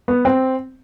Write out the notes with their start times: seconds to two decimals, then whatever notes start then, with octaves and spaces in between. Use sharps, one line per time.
0.08 B3
0.25 C4